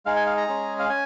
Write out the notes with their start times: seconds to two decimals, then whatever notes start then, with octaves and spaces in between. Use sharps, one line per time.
0.06 G#3 D#4 G#4 F5
0.16 G#5
0.26 F5
0.37 A#5
0.47 G#3 C#4 G#4
0.79 F5
0.89 C#4 G#5